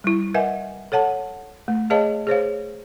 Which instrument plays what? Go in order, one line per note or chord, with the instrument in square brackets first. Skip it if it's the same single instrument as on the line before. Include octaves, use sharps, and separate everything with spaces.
[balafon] G3 E4
A#4 B4 D#5 E5 F#5 G#5
A4 C#5 F#5 A5
A3
G#4 B4 C#5 D#5 F5 A5
G#4 C5 C#5 F5